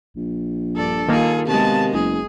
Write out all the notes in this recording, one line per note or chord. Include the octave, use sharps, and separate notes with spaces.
A#1
G2 A4 D5
D#3 A#3 F4 G#4
C3 G#3 B3 F#4 A5
F#1 G#4